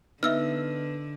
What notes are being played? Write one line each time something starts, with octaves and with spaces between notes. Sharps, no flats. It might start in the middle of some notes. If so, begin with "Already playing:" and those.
D3 B3 D#4 E5 E6 F6